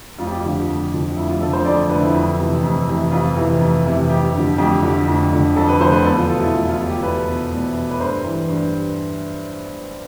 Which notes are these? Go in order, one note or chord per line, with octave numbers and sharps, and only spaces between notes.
F2 F4
G4
F4
D3 F3
F2
D3 F3
F2 E4
F4
D3 F3 A4
C5
F2 D5
D3 F3 B4
E4
F2
C3 E3
F2
C3 E3
F2 F4
C3 E3
F2
C3 E3
F2 G4
D3
F3
F2 G4
D3 F3
F2
D3 F3
F2 A4
B4
D3 F3 C5
B4
E2 A4
F4
B2 F4
E4
E2 F4
F4
B2
G4
E2 B4
B2
E2
B2
B4
G2 C5
E3
G2